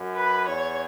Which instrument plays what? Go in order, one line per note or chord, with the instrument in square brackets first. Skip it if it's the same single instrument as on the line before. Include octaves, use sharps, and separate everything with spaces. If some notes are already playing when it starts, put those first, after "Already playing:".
Already playing: [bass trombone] F#2
[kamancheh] B4
[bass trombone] E2 [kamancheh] C#5